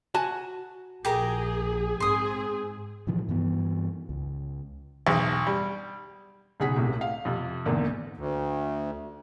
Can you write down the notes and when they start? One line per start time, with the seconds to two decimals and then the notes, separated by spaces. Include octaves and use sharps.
0.14 F#4 G#5 A5
1.05 A#1 G4 G#4 A#4 A#5
2.00 G#2 C4 G#4 C6 D#6
3.07 A2 C3 E3 F3
3.29 G2 E3 B3
4.09 C#2
5.07 B1 E2
5.47 G3
6.60 B1 C#3 G#4 F#5 B6
6.77 C2 A2 C3
7.01 F5
7.25 F2 C3
7.66 G#1 E2 A#2 D3
8.17 D2